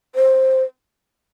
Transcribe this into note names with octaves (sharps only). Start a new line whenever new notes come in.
C5